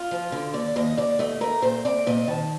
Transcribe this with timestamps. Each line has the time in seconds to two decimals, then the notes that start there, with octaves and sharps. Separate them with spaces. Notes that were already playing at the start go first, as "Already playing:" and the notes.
Already playing: F4
0.11 F3
0.32 D3
0.54 D#2 D5
0.76 D#2 D#5
0.98 D#2 D5
1.19 A3 D#5
1.41 A3 A#4
1.62 A#2 C5
1.85 C4 D5
2.06 A#2 D#5
2.28 D#3 A5